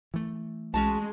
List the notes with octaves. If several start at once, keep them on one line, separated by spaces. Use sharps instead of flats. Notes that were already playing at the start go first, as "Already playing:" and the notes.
E3 A3
B1 G#3 C#4 F#4 A5